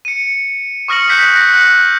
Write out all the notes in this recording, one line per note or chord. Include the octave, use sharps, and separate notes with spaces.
C#7 D#7
C#6 D#6 F6 A#6 C#7 F#7
F#6 G6 B6
F#6 A#6 C#7
F#6 F#7